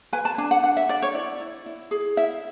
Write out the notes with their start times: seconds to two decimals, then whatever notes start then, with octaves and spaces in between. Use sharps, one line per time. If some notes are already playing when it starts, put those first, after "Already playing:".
0.13 B4 G#5
0.25 A5
0.38 D4 G#5
0.51 F#5
0.63 D4 F#5
0.77 E5
0.89 D4 D5
1.02 C#5
1.14 E4 D5
1.40 E4
1.66 E4
1.91 G#4
2.17 E4 E5